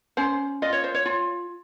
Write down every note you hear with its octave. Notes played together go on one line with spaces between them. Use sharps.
C#4 C5
F4 D#5
C#5
C5
C#5
F4